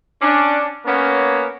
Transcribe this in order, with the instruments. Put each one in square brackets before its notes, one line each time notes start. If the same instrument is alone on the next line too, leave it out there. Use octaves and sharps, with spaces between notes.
[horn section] C#4 D4
A#3 B3 C#4